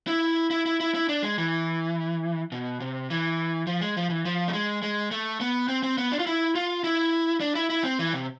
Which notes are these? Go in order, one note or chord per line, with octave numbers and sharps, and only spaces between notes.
E4
E4
E4
E4
E4
D4
G#3
E3
B2
C3
E3
F3
G#3
F3
E3
F3
A3
G#3
G#3
A3
B3
C4
C4
B3
D4
F4
E4
F4
E4
D4
E4
E4
C4
E3
C3